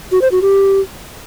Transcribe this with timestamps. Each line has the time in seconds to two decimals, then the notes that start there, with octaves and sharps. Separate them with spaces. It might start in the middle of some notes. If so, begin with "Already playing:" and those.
0.12 F#4
0.22 C5
0.32 F#4
0.42 G4